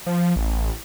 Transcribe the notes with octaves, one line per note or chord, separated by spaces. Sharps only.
F3
A1